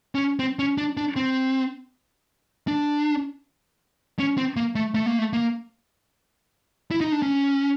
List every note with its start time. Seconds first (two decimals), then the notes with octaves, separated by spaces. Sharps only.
0.15 C#4
0.39 C4
0.59 C#4
0.78 D4
0.97 D4
1.16 C4
2.68 D4
4.19 C#4
4.38 C4
4.56 A#3
4.75 A3
4.95 A3
5.06 A#3
5.18 A3
5.33 A#3
6.91 E4
7.01 D#4
7.12 D4
7.22 C#4